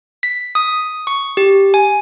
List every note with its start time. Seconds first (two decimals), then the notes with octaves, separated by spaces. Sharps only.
0.23 B6
0.55 D#6
1.07 C#6
1.37 G4
1.74 G#5